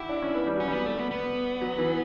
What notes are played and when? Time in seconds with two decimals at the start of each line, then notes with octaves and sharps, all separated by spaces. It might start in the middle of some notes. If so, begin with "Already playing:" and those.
Already playing: E4 F#4 G4
0.09 D4
0.22 C#4
0.35 B3
0.47 G3
0.57 F#3 C#4
0.68 G3 B3
0.86 A3
0.98 B3
1.11 B3
1.61 F#3
1.78 E3